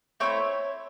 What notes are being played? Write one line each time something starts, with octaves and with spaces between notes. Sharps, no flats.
A3 C4 E4 C#5